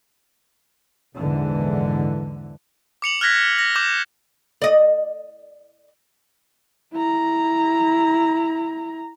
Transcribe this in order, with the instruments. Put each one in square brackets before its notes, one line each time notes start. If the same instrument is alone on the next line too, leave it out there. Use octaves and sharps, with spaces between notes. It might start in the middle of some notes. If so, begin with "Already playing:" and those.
[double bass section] A#1 E2 G#2 D3 E3
[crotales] D6 C#7 F7 F#7
F6 F#6 G#6 A#6 B6
A#6
D6 G6 E7
[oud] D5 D#5
[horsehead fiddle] E4 A#5